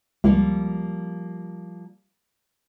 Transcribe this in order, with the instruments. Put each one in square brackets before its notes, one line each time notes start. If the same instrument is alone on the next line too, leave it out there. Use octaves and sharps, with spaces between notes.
[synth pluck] C#2 [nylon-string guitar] F3 G3 A#3